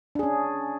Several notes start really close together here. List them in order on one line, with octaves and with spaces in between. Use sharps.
D4 G#4 C#4